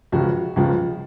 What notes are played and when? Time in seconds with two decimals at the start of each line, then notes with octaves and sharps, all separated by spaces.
0.12 C#2 C#3 F3 F#4
0.56 C#2 C#3 F3